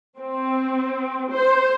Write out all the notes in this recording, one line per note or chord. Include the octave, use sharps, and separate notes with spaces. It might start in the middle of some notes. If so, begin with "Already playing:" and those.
C4
C5